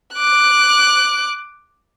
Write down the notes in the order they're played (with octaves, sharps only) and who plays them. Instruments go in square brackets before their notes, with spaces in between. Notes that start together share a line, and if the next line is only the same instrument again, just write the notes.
[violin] D6 F#6